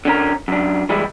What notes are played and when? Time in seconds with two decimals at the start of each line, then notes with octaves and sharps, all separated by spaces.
0.05 D3 C#4 A#4
0.48 F#2 D4
0.89 E3 G3 G#3 E4